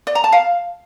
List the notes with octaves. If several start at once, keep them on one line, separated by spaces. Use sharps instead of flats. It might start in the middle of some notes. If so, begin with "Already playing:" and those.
D5
A#5
A5
F5